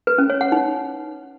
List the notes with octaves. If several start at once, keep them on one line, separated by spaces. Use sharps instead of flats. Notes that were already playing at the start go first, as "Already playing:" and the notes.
B4
C#4
C#5
F#5
D#4